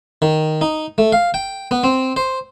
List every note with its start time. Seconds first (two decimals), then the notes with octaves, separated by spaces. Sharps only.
0.22 D#3
0.61 D#4
0.98 A3
1.12 F5
1.34 G5
1.71 B3
1.84 C4
2.17 C5